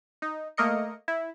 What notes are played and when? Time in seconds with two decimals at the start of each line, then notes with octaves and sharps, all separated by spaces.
0.22 D#4
0.57 A3 A#3 A#4 D#5 C#7
1.08 E4